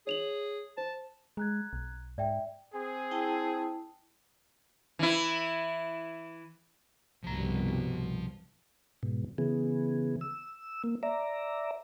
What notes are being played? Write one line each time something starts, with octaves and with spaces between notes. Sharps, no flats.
G#4 C#5 F7 F#7
C5 A5
G#3 A#5 F#6 G#6
B1
G#2 D5 E5 G5
C4 G#4
E4 G5 A5
E3 E4
C2 G2 B2 F3 A#5
G#2 B2
C#3 E3 B3 G#4
E6
A#3
D5 E5 A#5